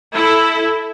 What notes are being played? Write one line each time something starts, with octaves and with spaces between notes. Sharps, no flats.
E4 A4